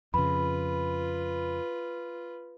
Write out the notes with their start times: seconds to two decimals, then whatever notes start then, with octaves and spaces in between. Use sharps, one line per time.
0.14 F2 C#3 F4 B4 B5